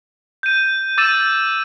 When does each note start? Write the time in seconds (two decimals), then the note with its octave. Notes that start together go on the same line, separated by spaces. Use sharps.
0.43 G6 D#7
0.98 D6 E6 A6 D#7 E7